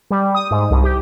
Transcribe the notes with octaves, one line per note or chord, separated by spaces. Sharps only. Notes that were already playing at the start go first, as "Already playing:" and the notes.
G3
D#6
G#2
C2
G4